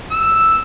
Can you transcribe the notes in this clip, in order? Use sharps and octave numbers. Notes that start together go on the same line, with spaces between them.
E6